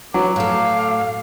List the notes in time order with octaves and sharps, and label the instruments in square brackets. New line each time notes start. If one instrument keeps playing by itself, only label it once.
[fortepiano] F#3 [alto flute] B4 [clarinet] D6
[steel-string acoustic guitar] A2 A4 [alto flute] F5